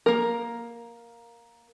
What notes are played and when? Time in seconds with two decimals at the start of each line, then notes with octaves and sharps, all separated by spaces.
0.06 A#3 A#4